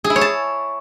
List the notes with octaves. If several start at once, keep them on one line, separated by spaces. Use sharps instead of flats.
G#4
E4
C#5
A5